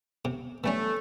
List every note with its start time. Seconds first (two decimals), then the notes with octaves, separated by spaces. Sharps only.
0.25 C3
0.64 E3 G3 A3 C#4